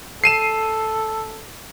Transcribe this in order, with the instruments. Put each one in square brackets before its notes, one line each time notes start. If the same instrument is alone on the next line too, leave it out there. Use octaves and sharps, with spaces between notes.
[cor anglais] A4 [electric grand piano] C7 D#7 E7